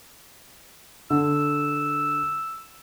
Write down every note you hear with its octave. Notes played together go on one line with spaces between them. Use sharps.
D3 E6